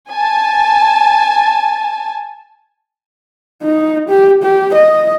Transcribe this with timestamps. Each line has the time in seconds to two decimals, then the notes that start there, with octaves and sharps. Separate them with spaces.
0.12 G#5 A5
3.63 D#4
4.09 G4
4.43 G4
4.75 D#5